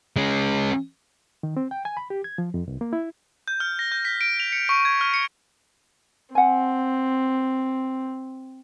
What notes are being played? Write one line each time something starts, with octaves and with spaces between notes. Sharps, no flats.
G#3 C#4
D#3
C4
G5
G#5
B5
G4
G#6
F3
F2
C2
A#3
E4
G6
F6
A#6
G6
B6
D7
F7
C#7
C#6
G#6
F6
C#7
C4 F#5 G#5